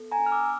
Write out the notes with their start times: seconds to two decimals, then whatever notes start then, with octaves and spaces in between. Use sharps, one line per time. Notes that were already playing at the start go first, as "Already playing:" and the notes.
Already playing: B3 A4
0.11 G#5 A#5
0.19 D4
0.26 F6
0.32 D6 E6